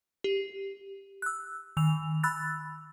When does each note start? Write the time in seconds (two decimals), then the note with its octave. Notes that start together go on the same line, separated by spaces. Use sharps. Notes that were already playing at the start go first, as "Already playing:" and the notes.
0.24 G4
1.22 E6 F#6
1.77 D#3 E6 F7
2.23 B5 E6 F#6 A6